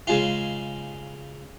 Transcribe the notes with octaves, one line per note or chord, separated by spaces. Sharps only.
C#3 G#3 F4